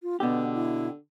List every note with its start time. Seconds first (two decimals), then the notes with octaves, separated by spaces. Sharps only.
0.03 F4
0.20 B2 D3 B3 G4
0.54 E4